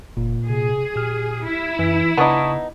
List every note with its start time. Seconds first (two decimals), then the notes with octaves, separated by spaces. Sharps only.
0.17 F#1 A#2
0.49 C3 G#4
0.96 A#2 G4 F6
1.46 E4
1.79 F#2 E3
2.17 C#3 B3 D4 D#4 A5 C#6 D#6